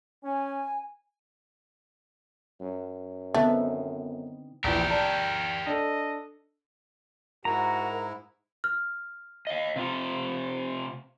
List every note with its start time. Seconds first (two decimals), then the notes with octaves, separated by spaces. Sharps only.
0.24 C#4 G#5
2.61 F#2
3.34 D3 A3 B3 C4 D#4
4.64 A#1 E3 G4 A#4 G5
4.90 D5 A5
5.67 D4 A4 D#5
7.45 G#2 E4 F#4 A#4 A#5
8.64 F6
9.47 D#5 F5
9.76 C3 C4 F4